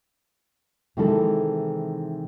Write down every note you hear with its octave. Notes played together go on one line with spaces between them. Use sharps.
C3 D#3 E3 G#3 E4 A4